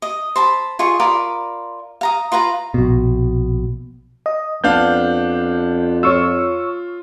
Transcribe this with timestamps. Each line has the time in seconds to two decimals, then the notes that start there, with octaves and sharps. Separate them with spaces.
0.02 D#5
0.36 C5 A5 B5
0.79 F4 G#4 D#5 C#6
0.99 F4 A#4 D5 B5
2.01 F5 A#5 D#6
2.32 F4 B4 F5 A#5
2.74 A#1 B2
4.26 D#5
4.64 F2 B3 D4 F5 G6
6.03 F4 C#5 C#6 E6